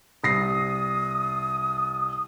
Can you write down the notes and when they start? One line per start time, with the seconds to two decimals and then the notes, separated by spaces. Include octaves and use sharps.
0.24 C2 D#6 A#6 C7